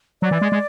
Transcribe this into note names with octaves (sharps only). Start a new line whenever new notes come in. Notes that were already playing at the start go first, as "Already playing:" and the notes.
F#3 D5
E3
G#3
G#3